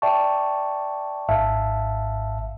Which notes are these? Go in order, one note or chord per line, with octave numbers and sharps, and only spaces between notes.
D5 E5 G5 A5 C#6
G#1 G#2 E5 F5 A5